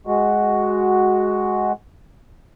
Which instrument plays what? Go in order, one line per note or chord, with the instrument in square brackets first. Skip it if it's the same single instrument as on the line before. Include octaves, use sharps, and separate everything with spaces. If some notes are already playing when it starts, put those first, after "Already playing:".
[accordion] G#3 F#4